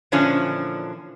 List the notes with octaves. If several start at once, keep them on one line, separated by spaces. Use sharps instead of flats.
A#2 D3 E3 F3 C#4 D4